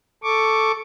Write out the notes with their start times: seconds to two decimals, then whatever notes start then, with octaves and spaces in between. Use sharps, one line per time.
0.23 A4 C#6 D6